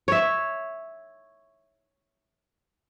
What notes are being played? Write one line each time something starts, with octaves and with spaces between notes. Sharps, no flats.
C#5 E5